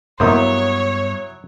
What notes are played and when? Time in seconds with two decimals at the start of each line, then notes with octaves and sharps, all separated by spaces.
0.20 G2 F#3 A#3 B3 E4 C5 C#5 D#6